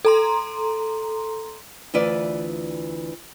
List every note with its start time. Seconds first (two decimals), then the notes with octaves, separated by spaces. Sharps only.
0.05 A4 A#5 C6
1.94 D2 E3 F4 B4 D5